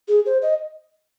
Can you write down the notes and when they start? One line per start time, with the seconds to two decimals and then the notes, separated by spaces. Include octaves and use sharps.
0.08 G#4
0.26 C5
0.42 D#5